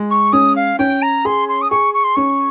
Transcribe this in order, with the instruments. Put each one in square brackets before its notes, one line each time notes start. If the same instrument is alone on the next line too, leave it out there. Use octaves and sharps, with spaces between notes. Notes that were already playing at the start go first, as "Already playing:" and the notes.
Already playing: [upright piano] G#3
[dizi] C#6
[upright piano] C#4 [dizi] D#6
[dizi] F5
[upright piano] C#4 [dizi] G5
[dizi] A#5
[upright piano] G#4 [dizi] C6
[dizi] C6
D#6
[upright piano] G#4 [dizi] C#6
[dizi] C#6
C6
[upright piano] C#4 [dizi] C#6